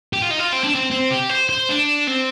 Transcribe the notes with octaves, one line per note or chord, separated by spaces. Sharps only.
G4
F4
D#4
F4
C4
D4
C4
C4
G4
C5
C5
D4
C4